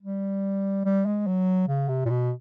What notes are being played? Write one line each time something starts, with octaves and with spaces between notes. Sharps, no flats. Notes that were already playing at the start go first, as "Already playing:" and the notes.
G3
G3
G#3
F#3
C#3
C3
A#2
B2